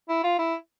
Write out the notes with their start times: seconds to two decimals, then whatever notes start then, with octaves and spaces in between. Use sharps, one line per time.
0.09 E4
0.24 F4
0.39 E4